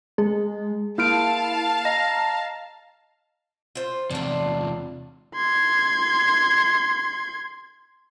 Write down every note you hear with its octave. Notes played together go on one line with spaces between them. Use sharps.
G#3 G#4
A#3 E4 F5 A5 F6 D7
D#5 A#5 A#6
F4 C5
E2 C3 D4 F4
C6 G#6